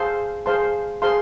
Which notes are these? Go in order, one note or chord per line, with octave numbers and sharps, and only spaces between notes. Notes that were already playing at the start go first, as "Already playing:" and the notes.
Already playing: G#4 C5 F5 A5 C6
G#4 C5 F5 A5 C6
G#4 C5 F5 A5 C6